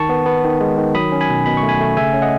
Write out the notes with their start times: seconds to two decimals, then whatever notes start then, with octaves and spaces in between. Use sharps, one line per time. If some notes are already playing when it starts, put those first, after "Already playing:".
Already playing: D#3 A5 C#6
0.09 B3
0.26 B3
0.44 D#3
0.61 G#3
0.77 D#3
0.95 F#3 B5 D#6
1.12 C#4
1.21 G#5 B5
1.29 B2
1.46 B2 B5
1.57 C#6
1.63 A3
1.69 G#5 B5
1.81 A3
1.97 C#3 E5 G#5
2.14 C#4
2.22 D#5 F#5